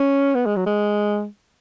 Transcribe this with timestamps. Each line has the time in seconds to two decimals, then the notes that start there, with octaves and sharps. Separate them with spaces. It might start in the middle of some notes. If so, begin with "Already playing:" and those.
Already playing: C#4
0.35 B3
0.46 G#3
0.56 F#3
0.66 G#3